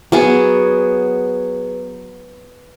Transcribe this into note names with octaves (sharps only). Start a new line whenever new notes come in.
F#3 B3 G#4